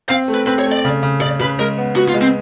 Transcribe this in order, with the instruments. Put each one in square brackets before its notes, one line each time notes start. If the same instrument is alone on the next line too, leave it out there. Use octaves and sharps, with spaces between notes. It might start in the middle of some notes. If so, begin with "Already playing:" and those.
[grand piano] C4 [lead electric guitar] F5
[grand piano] A3
[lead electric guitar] B4
[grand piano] C4 [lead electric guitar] B4
[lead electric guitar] C#5
[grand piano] A3
[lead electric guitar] D5
[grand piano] C#3
C#3
[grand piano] C#3 [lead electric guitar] D5
[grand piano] C#3 [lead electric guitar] B4
[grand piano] G#3 [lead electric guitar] A#4
[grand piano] B3
[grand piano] B3 [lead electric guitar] F#4
[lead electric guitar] F4
[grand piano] G#3
[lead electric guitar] C4